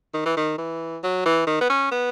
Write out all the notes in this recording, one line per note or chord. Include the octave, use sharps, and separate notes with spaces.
D#3
E3
D#3
E3
F#3
E3
D#3
B3
C#4
B3